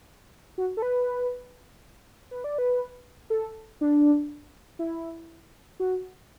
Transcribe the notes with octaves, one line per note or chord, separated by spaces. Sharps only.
F#4
A4
B4
B4
D5
B4
A4
D4
E4
F#4